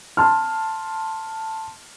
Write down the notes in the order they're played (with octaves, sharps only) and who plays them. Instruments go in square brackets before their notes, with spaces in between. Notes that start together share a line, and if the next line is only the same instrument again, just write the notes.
[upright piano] A5 C6 F6